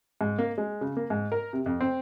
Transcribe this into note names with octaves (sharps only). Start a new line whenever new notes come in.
G#2
A#3
G#3
C#3
A#3
G#2
A#4
C3
F2
C4